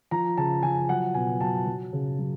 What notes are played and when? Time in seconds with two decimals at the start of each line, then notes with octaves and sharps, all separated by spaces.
0.11 F3 A#5
0.37 C#3 A5
0.63 F3 G#5
0.89 F#3 F#5
1.14 B2 G#5
1.41 F#3 A5
1.67 F#3
1.93 C#3
2.19 F#3